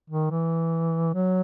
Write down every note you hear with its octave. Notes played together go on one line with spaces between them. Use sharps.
D#3
E3
F#3